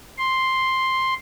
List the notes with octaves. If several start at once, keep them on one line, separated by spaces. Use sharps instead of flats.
C6